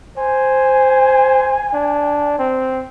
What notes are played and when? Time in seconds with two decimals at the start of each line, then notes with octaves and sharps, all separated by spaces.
0.18 C5 G#5
1.73 D4
2.39 C4